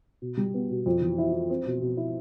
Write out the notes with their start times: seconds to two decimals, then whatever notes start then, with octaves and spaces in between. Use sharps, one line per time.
0.22 B2
0.37 G3
0.54 B3
0.70 B2
0.86 F2
1.02 E3
1.18 E4
1.34 E4
1.50 C4
1.66 B2
1.82 B2
1.97 E4